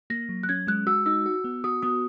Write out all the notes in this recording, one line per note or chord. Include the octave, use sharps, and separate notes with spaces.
A#3 A#6
F#3
F#6
C#4 G#6
G#3 F#6
F#4 E6
D#4 E6
F#4
B3
F#4 D#6
B3 D#6